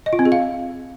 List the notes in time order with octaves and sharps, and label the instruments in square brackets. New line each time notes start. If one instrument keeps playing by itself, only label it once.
[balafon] D#5
F4
C4
G#4
F5